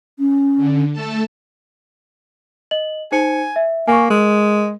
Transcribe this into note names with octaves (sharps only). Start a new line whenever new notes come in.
C#4
D3
A3 A4 A5
D#5 F#7
D#4 C5 G#5 C#7
E5
A#3 G#5 C#6
G#3 A#4